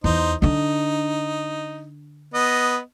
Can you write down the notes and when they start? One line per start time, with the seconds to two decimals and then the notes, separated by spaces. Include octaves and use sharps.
0.04 E2 D#4 C5
0.42 D3 D4 D#4
2.34 B3 D#5